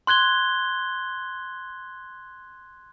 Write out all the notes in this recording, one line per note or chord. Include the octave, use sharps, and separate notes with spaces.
C6 F#6 G#6 G7